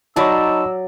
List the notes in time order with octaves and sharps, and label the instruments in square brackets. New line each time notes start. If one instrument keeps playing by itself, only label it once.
[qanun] F#3 D5 [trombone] D#4 [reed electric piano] A5 B5 C#6 [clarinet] E6